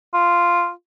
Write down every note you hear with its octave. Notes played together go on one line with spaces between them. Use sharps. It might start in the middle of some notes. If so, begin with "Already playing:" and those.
F4